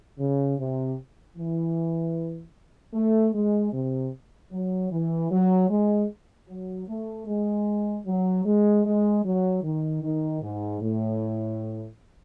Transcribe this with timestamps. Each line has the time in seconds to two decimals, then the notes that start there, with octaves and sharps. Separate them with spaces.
0.19 C#3
0.58 C3
1.37 E3
2.94 A3
3.33 G#3
3.72 C3
4.52 F#3
4.90 E3
5.31 F#3
5.70 G#3
6.48 F#3
6.88 A3
7.27 G#3
8.06 F#3
8.45 G#3
8.85 G#3
9.24 F#3
9.63 D#3
10.03 D#3
10.41 G#2
10.81 A2